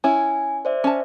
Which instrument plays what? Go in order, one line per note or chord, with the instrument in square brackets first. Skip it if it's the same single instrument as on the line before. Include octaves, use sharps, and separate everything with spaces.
[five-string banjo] C#4 E4 [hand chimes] G#5
[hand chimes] C5 D5 E5
[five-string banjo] C#4 A5